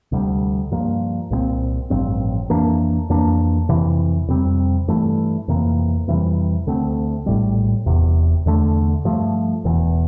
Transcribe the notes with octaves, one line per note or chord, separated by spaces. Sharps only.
D2 C3 G3
G2 F3 A#3
C2 A#2 G3 C4
A1 G2 F3 C4
F2 E3 A#3 D4
F2 E3 A#3 D4
F2 C3 E3
F2 C3 G3 C4
G2 E3 A3
F2 C3 E3 A#3
F2 C3 E3 G3
D2 D3 A3 C4
A#1 A2 G3
E1 E2 C3
E2 D3 A3
G2 F3 A3
E1 E2 E3